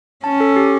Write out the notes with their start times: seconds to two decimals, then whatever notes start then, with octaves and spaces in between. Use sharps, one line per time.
0.24 C#4 A5
0.40 A4
0.56 G4